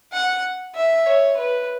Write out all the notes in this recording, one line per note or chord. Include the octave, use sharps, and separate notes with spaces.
F#5
E5
C#5
B4